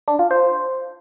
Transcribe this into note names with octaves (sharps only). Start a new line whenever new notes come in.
D4
F4
C5